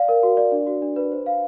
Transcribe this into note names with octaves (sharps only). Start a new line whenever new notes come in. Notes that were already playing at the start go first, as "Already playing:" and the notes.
Already playing: D5 F5
A#4
F#4
D5
D4
F#4
D4
B4
C5
F5